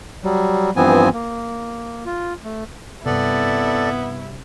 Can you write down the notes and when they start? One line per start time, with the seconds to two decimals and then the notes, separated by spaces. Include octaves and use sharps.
0.24 F#3 G3
0.76 G2 E3 F3 B3 C4 G#5
1.13 A#3
2.06 F4
2.44 A3
3.06 G2 C3 B3 E4 A4 D5